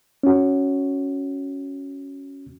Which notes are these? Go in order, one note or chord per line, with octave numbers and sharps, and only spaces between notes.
C#4 F#4